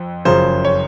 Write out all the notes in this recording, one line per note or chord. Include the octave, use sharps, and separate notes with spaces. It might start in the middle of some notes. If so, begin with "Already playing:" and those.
Already playing: F2
F#1 F#2 C#3 F3 C5
C#5